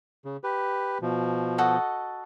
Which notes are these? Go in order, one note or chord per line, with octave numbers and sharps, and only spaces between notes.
C#3
G4 B4
B2 F3
F#4 A4 D#5